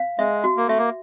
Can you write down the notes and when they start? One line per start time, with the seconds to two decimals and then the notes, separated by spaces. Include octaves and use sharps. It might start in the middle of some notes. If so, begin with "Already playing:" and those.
Already playing: F5
0.19 G#3 E5
0.44 F#4
0.57 A#3
0.68 A3 E5
0.78 A#3